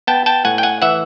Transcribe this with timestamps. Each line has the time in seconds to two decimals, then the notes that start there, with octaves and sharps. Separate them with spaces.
0.07 B3 G5 A5
0.26 G5 A5
0.45 A2 F#5 G#5
0.58 G5
0.63 F#5 G#5
0.82 E3 E5 F#5